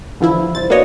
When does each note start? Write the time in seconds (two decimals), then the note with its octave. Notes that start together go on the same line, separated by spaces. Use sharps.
0.21 D3 E3 F3 E4
0.55 C2 C5 A6
0.70 A#3 B3 D4 F#4 C#5 D#5